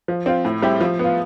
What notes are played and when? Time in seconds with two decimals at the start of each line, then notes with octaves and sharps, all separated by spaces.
0.08 F3
0.26 C4 F4
0.45 A2
0.62 G3 C4 E4 G4
0.80 F3
0.99 B3 F4